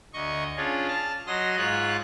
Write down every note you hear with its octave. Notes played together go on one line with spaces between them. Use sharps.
D2 D#5 C#6
C#4 D4 F4 G#4
A5 F6
F#3 D#5 C6 A#6
G#2 F4 C#5 F#6